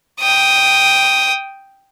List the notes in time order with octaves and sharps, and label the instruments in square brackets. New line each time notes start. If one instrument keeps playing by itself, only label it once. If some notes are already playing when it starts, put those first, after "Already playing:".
[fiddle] G5 D#6